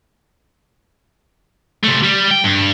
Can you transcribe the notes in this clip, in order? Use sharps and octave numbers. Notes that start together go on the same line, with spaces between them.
C3 A3
G3
G5
G2